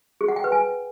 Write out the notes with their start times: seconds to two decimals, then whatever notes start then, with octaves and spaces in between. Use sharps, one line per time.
0.21 G#4
0.28 F#5
0.36 G5
0.44 B4
0.52 G#5